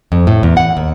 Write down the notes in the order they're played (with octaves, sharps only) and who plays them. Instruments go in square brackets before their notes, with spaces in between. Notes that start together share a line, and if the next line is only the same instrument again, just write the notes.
[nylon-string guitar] F2
A2
E2
F#5
D#2